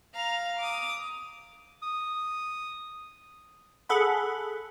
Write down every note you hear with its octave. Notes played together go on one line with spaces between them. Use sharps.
F5 A#5
D6 D#6
D#6
G#4 A4 F#5 B5